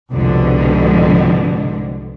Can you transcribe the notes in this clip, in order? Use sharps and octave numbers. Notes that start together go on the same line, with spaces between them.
C2 F2 G#2 B2 D3